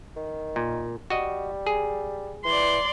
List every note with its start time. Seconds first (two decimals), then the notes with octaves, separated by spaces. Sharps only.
0.17 D#3
0.56 A#2
1.10 G3 F#4 D#5
1.67 G#4
2.45 E3 D5 C6